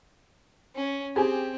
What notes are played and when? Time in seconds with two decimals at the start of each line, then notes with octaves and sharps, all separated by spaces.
0.75 C#4
1.16 C4 G4 G#4 G#5